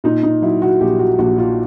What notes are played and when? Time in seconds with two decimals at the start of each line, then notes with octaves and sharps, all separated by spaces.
0.04 A#2 D#4
0.23 D#4
0.42 F#3 E4
0.62 F#4
0.81 A#1 G4
0.99 F#4
1.19 A#1 F#4
1.38 F4